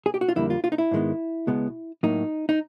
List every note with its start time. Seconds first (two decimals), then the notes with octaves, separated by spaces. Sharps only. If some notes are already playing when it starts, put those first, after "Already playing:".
0.06 G#4
0.14 G4
0.21 F#4
0.29 F4
0.36 F2 D3 G3 A#3 E4
0.50 F4
0.64 F4
0.72 D#4
0.78 E4
0.91 G#2 D#3 G#3 B3
1.47 C#2 B2 G#3 B3
2.03 A2 F#3 A#3 D#4
2.49 D#4